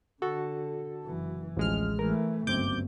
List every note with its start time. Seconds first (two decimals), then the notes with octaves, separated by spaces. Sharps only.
0.22 D3 F#4 A4
1.05 F#1 E3
1.57 A1 D2 F3 G#3 F6
1.99 E3 A3 A#4
2.47 G1 C#2 F#2 C4 D6 G6